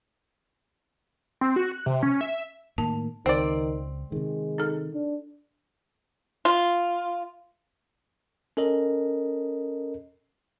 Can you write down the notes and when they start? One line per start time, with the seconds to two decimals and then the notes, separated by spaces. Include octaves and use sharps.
1.41 C4
1.56 F#4
1.72 F#6
1.86 C3
2.03 C#4
2.21 E5
2.78 A2 D#3 A#3 A5
3.26 C#2 D#3 C4 D5
4.12 C3 D#3 G#3
4.58 D#4 A4
4.94 D4
6.45 F4
8.57 C#4 A4 A#4 D#5